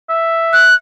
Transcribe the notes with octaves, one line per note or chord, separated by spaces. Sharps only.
E5
F#6